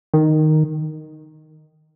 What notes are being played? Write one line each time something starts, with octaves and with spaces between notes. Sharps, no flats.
D#3